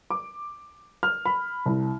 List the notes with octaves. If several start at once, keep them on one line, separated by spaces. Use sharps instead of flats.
D6
F6
B5
C2